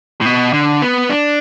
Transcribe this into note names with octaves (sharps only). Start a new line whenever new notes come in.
A2
B2
D3
B3
D4